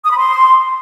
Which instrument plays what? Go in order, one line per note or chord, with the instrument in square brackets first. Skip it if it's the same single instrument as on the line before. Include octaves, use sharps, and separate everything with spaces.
[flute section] D#6
B5
C6